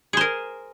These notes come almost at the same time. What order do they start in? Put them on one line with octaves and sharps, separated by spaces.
G#4 C5 A#4